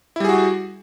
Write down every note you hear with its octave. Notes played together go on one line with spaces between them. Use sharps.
G3 E4 F#4 G#4